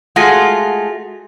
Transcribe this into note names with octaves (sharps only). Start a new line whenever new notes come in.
G#3 A3 F4 F#4